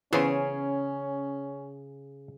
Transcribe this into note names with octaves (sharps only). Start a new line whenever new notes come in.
C#3 E3 B3 C#4 G#4 C5